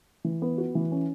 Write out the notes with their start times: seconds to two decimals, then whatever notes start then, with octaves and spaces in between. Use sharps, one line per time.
0.24 E3
0.42 B3
0.58 F#4
0.75 E3
0.92 C#4